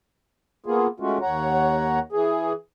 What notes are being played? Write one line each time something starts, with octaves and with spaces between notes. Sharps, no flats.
A#3 B3 F4 G#4
G#3 A3 C#4 F4 F#4
D#2 C#5 F#5 A#5
E3 G#4